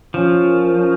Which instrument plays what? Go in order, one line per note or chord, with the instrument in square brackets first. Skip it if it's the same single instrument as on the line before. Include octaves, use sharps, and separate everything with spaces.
[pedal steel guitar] F3 [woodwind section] C#4
[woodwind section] A#4
C#4